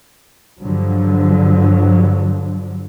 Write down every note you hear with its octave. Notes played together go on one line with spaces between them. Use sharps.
G2 D3 F3 F#3